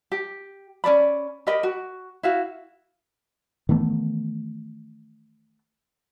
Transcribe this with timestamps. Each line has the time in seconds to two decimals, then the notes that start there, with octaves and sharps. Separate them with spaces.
0.12 G4
0.84 C#4 D4 D5 B5
1.47 G4 A#4 D#5 B5
1.63 F#4
2.23 E4 F#4 F5
3.69 D#3 E3 A3 B3